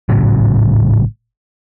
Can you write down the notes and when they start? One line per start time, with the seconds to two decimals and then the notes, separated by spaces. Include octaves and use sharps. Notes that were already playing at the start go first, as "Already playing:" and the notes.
0.09 G#1 A2 C#3 F#3